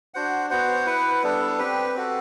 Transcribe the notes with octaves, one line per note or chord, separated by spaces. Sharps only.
D4 F#4 C5 F#5
B3 F#4 C5 F#5
E4 B4 F#5
G3 B3 D4 A4
C4 G4 B4
C4 F#4 A4